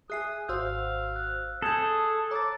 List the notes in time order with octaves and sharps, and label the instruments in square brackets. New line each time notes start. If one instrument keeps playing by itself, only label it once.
[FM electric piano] G#4 E5 G#5 [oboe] D#6 [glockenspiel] F#6 C7
[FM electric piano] G#1 F#4 C5 [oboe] F5 [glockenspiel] E6 G6
[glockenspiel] F#6
[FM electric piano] C4 G#5 [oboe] G#4 [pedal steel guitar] A4 [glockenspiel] G6 F#7
[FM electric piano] C#5 [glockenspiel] A#5 E6 A6 [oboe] D6